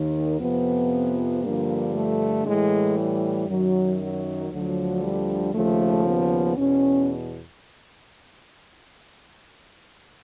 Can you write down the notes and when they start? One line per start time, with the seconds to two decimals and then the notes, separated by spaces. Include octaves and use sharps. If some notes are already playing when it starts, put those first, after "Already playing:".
Already playing: D#2 D#3
0.39 F2 C3 F3 B3
1.42 G2 D3 F3 A#3
1.94 A3
2.44 A2 E3 G#3
2.97 G3
3.47 F#2 D#3 F#3
4.00 F#3
4.50 D2 D3 F3 F#3
5.02 G3
5.53 D#2 C#3 F3 A3
6.06 B3
6.56 E2 B2 C#4